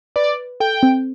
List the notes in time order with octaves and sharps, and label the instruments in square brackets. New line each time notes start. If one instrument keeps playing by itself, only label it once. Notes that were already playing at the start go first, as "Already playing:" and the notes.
[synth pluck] B4 [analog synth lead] D5
[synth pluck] A4 [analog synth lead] G5
[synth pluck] C4